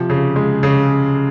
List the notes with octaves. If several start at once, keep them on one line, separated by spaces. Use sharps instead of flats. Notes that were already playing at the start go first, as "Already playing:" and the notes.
Already playing: C3 F3
C#3
G#3
C#3